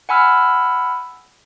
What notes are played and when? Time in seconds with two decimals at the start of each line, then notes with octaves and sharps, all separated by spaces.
0.09 F#5 G#5 B5 E6 F6